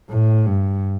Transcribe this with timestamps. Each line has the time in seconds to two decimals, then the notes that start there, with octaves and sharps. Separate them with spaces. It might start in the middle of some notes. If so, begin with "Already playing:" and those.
0.10 A2
0.46 G2